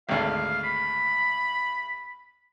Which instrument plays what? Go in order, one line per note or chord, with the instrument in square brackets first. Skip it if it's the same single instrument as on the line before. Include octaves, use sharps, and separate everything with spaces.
[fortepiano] G#1 D2 [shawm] F5
[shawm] B5